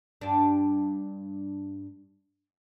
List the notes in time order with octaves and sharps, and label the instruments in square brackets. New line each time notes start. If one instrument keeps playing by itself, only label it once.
[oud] G2 D4